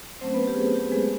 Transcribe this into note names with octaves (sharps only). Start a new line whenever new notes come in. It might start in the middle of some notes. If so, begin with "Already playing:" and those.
F#3 A3 C4 C#4 C5
B3 B4
G4
G#4
G4
G4
G#3 G#4